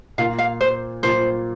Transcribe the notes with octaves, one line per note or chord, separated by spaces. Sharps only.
A#2 A#3 F4 F5
F5
C5
A#2 A#3 F4 C5